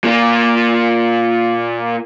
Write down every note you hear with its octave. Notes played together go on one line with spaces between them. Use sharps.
A#2 A#3